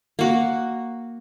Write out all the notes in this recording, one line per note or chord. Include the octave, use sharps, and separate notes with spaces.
A#3 F#4